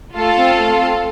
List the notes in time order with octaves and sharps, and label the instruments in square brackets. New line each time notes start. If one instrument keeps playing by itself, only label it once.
[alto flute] A3 [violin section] F4 A4 F5 A5
[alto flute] C4
A3
C4